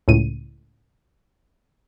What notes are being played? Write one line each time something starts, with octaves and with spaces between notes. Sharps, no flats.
C#2 A2 D#7